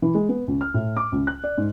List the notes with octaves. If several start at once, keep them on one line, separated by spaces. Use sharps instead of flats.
E3
G#3
B3
C#2
F6
A2
D6
C#2
F#6
D5
G#2